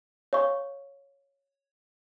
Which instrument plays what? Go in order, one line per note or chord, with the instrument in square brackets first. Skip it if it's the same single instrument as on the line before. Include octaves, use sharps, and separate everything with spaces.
[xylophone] C#5 F5 C#6